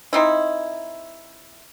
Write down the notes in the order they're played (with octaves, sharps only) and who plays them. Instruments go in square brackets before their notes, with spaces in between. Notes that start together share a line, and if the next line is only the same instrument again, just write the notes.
[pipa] C4 D#4 E4